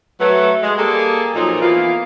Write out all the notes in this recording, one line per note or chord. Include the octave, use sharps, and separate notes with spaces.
F#3 A3 B4
G#3
G3 A#3 G#4 A4
A#2 F3 F#3 D#4 A4 A#4
E3 A#3 B3 F4